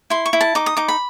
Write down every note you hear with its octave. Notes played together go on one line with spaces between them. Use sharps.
E4 C6
C#6
E4
A5
D#4 D6
D#6
D#4 D6
B5